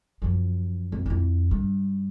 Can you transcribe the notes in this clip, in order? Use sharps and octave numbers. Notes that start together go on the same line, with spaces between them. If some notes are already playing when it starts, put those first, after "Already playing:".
F#2 F3
F2
F2 E4
G2